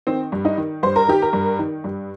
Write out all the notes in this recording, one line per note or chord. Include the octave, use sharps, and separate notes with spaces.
D#3 C4
G2
D#4
D#3
G2 C5
A#4
D#3 G4
A#4
G2
D#3
G2